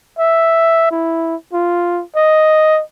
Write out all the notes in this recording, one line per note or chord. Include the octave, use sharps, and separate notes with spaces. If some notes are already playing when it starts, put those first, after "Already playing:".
E5
E4
F4
D#5